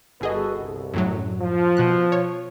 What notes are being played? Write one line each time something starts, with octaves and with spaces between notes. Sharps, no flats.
G1 F#4 G#4 A4 B4 D#5
C2
F#2 A2 F#3
F3
B2 F#6
C#5